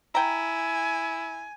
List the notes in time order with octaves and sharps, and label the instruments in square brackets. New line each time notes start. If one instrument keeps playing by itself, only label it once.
[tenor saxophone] E4 [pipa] G5 A#5 [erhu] G#5